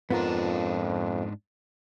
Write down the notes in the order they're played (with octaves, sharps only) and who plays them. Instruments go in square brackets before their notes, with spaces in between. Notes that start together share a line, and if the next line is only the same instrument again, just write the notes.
[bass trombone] F2 [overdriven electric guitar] G#2 D4 [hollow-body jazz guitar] B3 F4 A#4